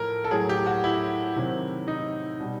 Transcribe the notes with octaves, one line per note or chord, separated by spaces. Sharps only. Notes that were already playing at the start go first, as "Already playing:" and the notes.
Already playing: A2 F3 A#4
A4
A2 F#3 G#4
G4
F#4
E4
C3 D#3 F#3
D#4
B2 G3